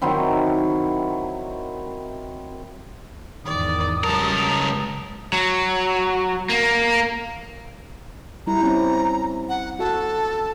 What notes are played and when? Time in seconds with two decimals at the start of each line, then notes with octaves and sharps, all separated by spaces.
0.02 D#3 F#3 C4 E4
3.46 E2 G#2 D#3 D5 D#6
4.04 C#2 F#3 G3 A#4 A5
5.33 F#3
6.49 A#3
8.47 G3 E4 A#5
8.61 C4 C#4 E4
9.49 F#5
9.79 F#4 A4 F#5